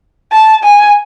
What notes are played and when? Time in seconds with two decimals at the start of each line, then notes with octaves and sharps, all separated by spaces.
0.32 A5
0.64 G#5